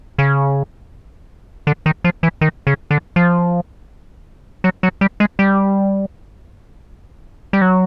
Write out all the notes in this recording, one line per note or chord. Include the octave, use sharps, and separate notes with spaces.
C#3
D3
D#3
F3
E3
D#3
C#3
D3
F3
F#3
F#3
G3
G#3
G3
G3
F#3